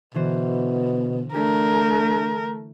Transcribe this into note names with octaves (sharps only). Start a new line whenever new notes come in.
B2 D3 E3 C5
A3 D4 A#4